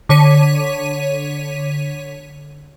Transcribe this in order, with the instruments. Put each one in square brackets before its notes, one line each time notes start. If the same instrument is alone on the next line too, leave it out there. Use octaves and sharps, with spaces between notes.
[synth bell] D3 C#5 B6 D#7